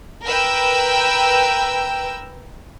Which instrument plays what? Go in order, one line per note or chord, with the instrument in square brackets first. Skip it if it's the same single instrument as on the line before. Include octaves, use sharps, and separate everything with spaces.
[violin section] A#4 B4 G5 E6